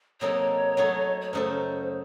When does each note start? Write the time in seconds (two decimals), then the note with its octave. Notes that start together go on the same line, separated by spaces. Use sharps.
0.21 C3 F#3 A#3 D#4 A4 C#5
0.77 F#3 A3 D#4 F#4 A4
1.21 C#5
1.33 F#2 C#3 A3 D#4 A4 C5